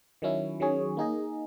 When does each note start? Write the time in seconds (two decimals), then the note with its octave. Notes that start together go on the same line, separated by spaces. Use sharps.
0.22 D#3 F#3 C#4 E4
0.60 D#3 F#3 C#4 G#4 C#5
0.97 A#3 D#4 G#4 D#5